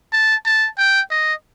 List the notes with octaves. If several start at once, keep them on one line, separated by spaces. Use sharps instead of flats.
A5
A5
G5
D#5